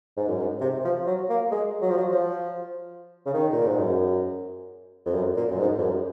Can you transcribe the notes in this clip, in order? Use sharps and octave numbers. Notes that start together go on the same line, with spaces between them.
G#2
F#2
G#2
C3
F3
F#3
A#3
G#3
F#3
F3
F#3
F3
C#3
D#3
A#2
G#2
F#2
F2
F#2
A#2
F#2
G#2
F2
F#2